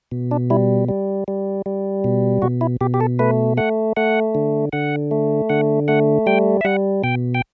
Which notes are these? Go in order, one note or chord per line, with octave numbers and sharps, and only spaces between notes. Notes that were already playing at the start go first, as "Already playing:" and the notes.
B2
D4
G3 E4
G3
G3
G3
B2
B2 F#4
E4
B2 G4
G4
A4
A3 B4
A3 F#5
A3 F#5
D3
D3 F#5
A3
D3 F#5
A3 F#5
G3 G5
E5
G3 F#5
B2 G5
G5